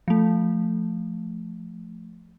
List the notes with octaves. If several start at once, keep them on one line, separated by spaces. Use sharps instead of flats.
F3 A3